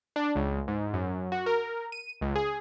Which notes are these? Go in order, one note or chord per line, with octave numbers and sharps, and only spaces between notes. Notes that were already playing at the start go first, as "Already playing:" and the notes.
D4
C#2
G#2
F#2
F#4
A#4
D#7
C#2
G#4